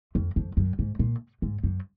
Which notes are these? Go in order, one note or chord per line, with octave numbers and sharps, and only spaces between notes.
F2
F2
F#2
G#2
A#2
G#2
F#2